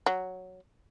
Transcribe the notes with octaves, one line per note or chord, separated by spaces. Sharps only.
F#3